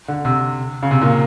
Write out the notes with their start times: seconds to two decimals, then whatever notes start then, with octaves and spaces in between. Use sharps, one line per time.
0.08 D3
0.25 C3
0.83 C#3
0.91 C3
1.02 A#2